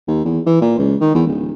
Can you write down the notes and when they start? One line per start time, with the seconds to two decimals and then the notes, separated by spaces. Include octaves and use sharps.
0.08 D#2
0.25 E2
0.46 E3
0.61 A#2
0.79 C#2
1.01 D#3
1.15 E2
1.27 D1